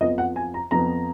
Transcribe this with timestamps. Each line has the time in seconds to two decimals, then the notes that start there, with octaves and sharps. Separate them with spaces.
0.01 F2 F3 B3 D#5
0.18 F#5
0.36 G#5
0.54 A#5
0.71 F2 F3 B3 A#5